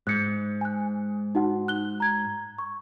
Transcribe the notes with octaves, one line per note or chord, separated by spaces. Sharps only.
G#2 F#6 C#7
G#5 F#6
D#4 F#4 F#5
F#6 G7
A#5 G#6
C#6